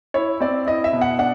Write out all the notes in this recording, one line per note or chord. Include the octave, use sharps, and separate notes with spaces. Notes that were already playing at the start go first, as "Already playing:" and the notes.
E4 C#5
C4 D5
E4 D#5
E5
B2
F#5
D4 F#5